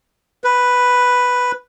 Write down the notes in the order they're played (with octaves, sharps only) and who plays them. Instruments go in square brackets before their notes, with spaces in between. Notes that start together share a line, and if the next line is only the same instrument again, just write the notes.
[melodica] B4